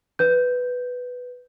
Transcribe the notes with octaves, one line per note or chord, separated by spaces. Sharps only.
B4 G6